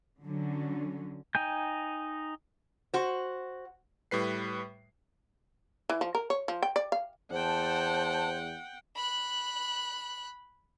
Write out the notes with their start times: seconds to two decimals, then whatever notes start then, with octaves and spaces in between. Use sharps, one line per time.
0.25 D3 F#3 C#4
1.35 D#4 G5 G#5 G6
2.94 F#4 C5
4.11 A2 G3 B4 C7
5.90 E3
6.01 F3
6.15 A#4
6.30 C#5
6.48 F3
6.63 G5
6.76 D5
6.92 F5
7.31 E2 C5 F#5 G5 A5
8.96 B5 F#6